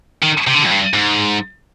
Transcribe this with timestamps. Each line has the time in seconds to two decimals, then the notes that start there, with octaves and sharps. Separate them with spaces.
0.23 D#3
0.48 C3
0.55 D3
0.62 C3
0.66 F2
0.71 G2
0.94 G#2